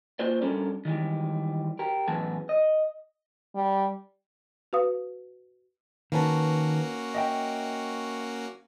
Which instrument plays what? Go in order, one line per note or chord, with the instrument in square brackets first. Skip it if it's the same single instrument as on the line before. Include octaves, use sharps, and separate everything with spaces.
[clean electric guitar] A#3 F4 C5 D5
G3 C#4 D4 A4 A#4
D#3 E3 G3 G#3
G4 A#4
F#2 A2 E3 B3 G#4 A5
D#5
[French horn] G3
[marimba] F#4 B4 F5 D#6
[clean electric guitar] D#3 B4 A5 [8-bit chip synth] A#3 C#4 F#4
[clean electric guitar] D#5 E5 G5